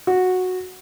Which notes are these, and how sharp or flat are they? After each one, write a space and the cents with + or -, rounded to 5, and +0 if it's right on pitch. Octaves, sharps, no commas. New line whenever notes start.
F#4 -10